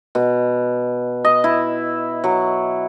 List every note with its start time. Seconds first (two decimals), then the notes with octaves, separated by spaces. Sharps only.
0.15 B2
1.25 D#5
1.44 E4
2.24 F#3